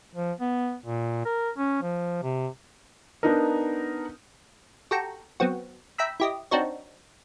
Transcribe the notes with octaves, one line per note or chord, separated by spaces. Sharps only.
F3
B3
A#2
A#4
C#4
F3
C3
B3 D4 D#4 A#4
F#4 G4 A4 G5 A#5 C#6
F#3 B3 C4 F#4
E5 G5 A#5 B5 E6
E4 G4 D#5
C4 D4 D#4 F#4 C#5